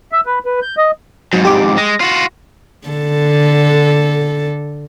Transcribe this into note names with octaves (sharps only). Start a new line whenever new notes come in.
E5
B4
B4
G6
D#5
F2 G#2 F#3
G4 D6
G#3 A#6
F4 F#4
D3 A4